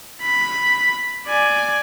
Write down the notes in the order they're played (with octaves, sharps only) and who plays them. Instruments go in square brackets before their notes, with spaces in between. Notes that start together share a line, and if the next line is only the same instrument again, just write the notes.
[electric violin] B5
D5 G#5